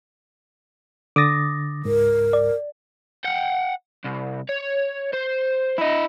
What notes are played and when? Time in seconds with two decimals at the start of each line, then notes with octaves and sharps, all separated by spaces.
1.16 D3 D6 D#6 A6 A#6
1.85 C#2 G#2 A#4
2.33 D5
3.25 F#5 G5
4.05 C2
4.49 C#5
5.13 C5
5.78 E4 D#5